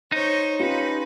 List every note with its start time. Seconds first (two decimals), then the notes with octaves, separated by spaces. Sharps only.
0.12 D#4 C5 C#5
0.60 C#4 F4 G4 B4